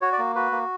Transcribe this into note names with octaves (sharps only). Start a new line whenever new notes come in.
F#4 C#5
D5
A#3
F#4 B4
A#3